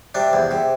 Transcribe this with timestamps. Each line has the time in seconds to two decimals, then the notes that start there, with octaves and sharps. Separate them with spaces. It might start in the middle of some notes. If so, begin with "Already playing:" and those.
0.15 C3 D4
0.33 E2
0.51 C3